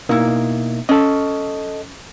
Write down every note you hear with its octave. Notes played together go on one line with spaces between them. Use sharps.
B2 A#3 D#4 E4
C#4 A4 D#5